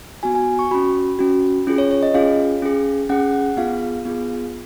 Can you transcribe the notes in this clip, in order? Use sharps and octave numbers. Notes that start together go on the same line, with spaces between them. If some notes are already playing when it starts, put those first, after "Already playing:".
B3 F#4 G#5
G#5
C#6
C#4 F#4 B5
C#4 F#4
C#4 F4 G#4
C#5
C#5
D#5
C#4 F4 G#4 F5
C#4 G#4
C#4 G#4 F#5
F#5
B3 F4 G#4 F5
B3 F4 G#4